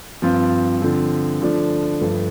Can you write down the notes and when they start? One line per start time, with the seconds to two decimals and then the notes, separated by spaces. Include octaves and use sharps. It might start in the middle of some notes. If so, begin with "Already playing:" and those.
0.22 G2 F3 C4 F4
0.81 D3 F3 C4
1.41 D3 F3 A3 D4
2.01 G2 F3 A3